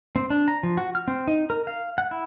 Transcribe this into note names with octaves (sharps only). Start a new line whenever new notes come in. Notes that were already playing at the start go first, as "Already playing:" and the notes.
C4
D4
A#5
F3
F#4
F6
C4
D#4
A#4
F5
F#5
E4